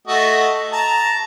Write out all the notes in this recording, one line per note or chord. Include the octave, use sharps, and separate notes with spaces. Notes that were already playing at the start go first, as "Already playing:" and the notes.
A3 F#4 D#5
A5 A#5